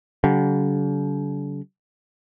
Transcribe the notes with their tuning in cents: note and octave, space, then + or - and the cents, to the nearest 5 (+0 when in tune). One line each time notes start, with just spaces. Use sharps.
D3 -45 F#3 +45